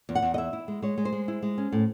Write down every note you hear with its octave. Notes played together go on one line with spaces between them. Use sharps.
E2
F#5
E2
D#5
E4 E5
E4
G#3
G#3 C#5
G#3
C5
G#3
E4
G#3
C#4
A2